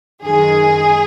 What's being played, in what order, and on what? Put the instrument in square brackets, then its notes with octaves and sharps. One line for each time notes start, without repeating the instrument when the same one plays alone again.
[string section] F#2 D#3 G#3 G#4